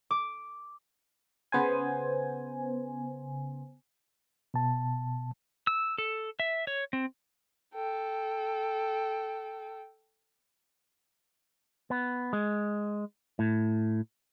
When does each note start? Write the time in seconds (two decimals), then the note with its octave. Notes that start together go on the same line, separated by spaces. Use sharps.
0.11 D6
1.52 C#3 B3 C5 G#5
4.54 B2 A5
5.67 E6
5.98 A4
6.40 E5
6.67 C#5
6.93 C4
7.74 A4 G5
11.90 B3
12.33 G#3
13.39 A2